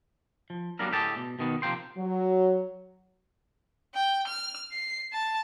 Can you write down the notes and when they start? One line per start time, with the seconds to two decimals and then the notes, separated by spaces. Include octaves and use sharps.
0.50 F3
0.79 F#3 G3 A#3 B3 D4 A#4
0.92 A2 D3 G4 G#4 A5
1.16 B2
1.39 B2 D#3 B3
1.62 C3 F3 A#3 G5 C6
1.97 F#3
3.95 G5
4.28 F6
4.72 C7
5.13 A5